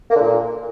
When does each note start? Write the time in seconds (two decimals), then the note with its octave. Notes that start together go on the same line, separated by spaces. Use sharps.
0.11 A#3
0.16 D3
0.21 A#2